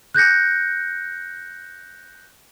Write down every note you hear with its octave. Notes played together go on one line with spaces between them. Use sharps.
F#6 G6 A#6 C#7